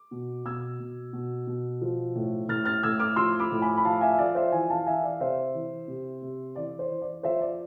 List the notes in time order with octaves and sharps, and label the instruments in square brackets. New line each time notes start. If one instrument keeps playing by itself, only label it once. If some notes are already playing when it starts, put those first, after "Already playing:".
Already playing: [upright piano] D6
B2
B2 E6 G#6
B2
B2
B2
F3
A2
A2 F6 A6
F6 A6
A2 E6 G#6
D6 F6
F3 C6 E6
B5 D6
A2
G#5 B5
B5
F3 F5 A5
E5 G#5
F3 D5 F5
C5 E5
E3 E5 G#5
F5 A5
E3 E5 G#5
D5 F5
C3 C5 E5
E3
C3
C3
E3 D5
C5
E3
D5
F3 C5 E5
D5